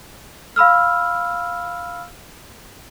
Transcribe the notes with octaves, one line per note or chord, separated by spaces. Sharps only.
F5 B5 E6 F6